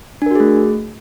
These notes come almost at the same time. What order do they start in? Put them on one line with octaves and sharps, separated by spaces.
D4 A#4 F#4 G#4 A3